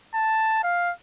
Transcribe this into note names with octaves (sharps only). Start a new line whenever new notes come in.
A5
F5